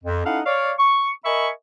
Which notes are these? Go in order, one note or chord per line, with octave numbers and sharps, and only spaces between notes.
F2
C#4 D#4 E4 A4 F5 F#5
C#5 D5 F5
C#6
A#4 D#5 E5 G#5 B5 C#6